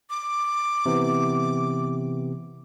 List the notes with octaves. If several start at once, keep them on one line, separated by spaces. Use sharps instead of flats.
D6
C3 E3 B3